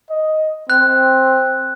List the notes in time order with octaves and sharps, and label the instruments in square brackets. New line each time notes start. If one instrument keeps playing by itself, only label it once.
[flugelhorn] D#5
[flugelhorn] C4 [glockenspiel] F#6